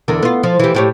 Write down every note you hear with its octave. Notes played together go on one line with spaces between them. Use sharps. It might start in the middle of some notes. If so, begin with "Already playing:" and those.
E2 D3 A#4
B3 F4
F3
E3 G4
A2 G4 C#5